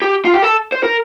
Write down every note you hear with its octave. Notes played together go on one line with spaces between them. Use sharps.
G4
F4
G4
A4
C5
A#4